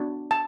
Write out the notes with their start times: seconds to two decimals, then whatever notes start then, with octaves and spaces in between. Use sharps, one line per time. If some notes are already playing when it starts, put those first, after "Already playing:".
Already playing: B3 D4 F#4
0.31 A5